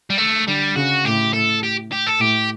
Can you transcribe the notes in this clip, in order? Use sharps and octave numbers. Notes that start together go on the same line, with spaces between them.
G3
A3
D3 G3
C#3 F#4
A2 G4
A4
G4
G4
A4
A2 G4